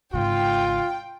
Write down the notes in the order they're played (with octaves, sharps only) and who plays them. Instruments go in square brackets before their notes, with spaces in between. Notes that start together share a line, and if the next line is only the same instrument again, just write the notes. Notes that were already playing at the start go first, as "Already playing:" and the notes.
[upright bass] G#1 C#3 [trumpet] F4 [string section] G5